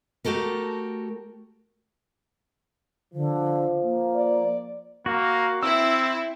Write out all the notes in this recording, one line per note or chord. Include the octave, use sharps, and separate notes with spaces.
A3 F#4 G4 A4 A#4
D3 F3
A#3
D5
A#3 F#4
C4 E4 E6